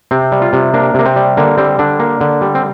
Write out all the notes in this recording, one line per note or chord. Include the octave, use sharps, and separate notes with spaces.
C3 C4
G3
F4
C3
A#3 D4
C3 A#3
C4
G3
D3 A#3
G3 C4
D3 D4
A#3
D3
G3
C4